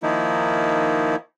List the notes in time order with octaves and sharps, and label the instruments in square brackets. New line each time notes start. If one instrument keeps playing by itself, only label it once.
[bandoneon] D#3 F3 A#3 D#4 E4